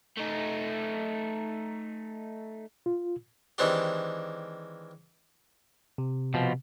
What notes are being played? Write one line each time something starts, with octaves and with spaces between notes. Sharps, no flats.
A3 D#4
F4
D#3 E3 G#3 C4 D4 G4
C3
B2 F3